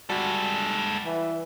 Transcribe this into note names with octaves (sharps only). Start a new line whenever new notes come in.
G3 G#3 F#4 A4
E3